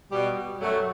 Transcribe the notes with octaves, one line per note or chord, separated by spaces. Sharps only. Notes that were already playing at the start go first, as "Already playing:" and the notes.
B2 G3
F#2 F#3 A3